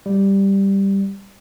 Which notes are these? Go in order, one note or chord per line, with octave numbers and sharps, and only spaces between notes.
G3